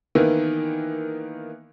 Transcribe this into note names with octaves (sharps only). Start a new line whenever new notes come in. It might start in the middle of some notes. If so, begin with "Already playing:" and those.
D#3 E3 A#3 B3